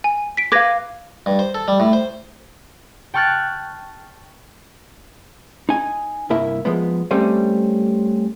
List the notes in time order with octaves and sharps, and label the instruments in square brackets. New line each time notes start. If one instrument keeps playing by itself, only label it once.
[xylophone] G#5
B6 D7
[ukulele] B4 F5 [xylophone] D6 G#6 A#6
[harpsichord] G2
C5
A4
G3
A2
C5
[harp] G5 A5 C#6 F6 F#6 A6
[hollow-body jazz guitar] D#4 G#5
C2 G2 A#3 E4 E5
F3 G#3 B3
G3 A3 C4 C#4